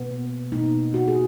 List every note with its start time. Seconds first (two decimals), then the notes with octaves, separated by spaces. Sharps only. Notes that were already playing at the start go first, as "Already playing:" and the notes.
Already playing: B2 A#3 B3
0.52 B2 A#3 B3 D#4
0.94 F#4
1.08 G#4